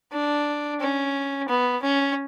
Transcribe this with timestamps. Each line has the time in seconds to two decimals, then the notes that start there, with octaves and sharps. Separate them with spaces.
0.12 D4
0.81 C#4
1.48 B3
1.82 C#4